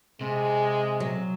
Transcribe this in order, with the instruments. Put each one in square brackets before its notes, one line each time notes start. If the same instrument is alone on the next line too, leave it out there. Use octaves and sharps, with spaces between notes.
[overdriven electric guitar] C3 [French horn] G#3
[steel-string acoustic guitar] F#3